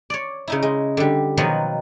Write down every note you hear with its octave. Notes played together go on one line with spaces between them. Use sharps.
C#5 D5
C#3 D#4 E4
G#3
D3 G3
B2 D#3 F3 F#3 A#3 B3